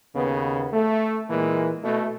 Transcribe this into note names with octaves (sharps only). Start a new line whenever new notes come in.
D#2 C#3 B3
A3
A#2 E3 G#3 A#3
B2 A3